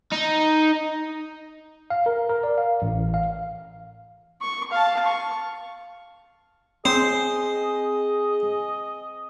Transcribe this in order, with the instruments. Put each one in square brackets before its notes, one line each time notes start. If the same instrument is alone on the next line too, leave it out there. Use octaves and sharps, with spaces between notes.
[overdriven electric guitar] D#4
[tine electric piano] F5
A#4
A#4
D5
F5
A1
F5
[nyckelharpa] C#6
F5 A5
C#6
[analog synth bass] C4 [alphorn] G#4 [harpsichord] C5 [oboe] D#5